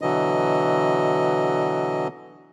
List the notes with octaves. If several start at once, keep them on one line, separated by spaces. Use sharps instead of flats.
B2 D3 E3 F#3 D#5